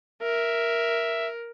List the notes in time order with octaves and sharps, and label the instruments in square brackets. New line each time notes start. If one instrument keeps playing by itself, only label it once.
[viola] A#4 [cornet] E5